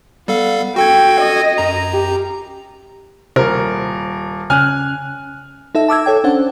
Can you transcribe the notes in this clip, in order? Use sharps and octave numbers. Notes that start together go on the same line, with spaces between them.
G3 B3 A4 F5
F#4 A4 G5 G#6
D#5
F#2 A#5
G4
D#1 C3 A#4
C#3 C#4 G#5 F6 F#6
D#4 A4 E5
A5 D6 E6 G#6
A4 C#5 G5
C#4 D4 C5 F#5